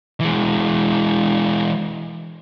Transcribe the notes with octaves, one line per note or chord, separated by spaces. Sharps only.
E3 G#3